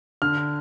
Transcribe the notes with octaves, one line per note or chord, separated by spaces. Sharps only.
D3 F6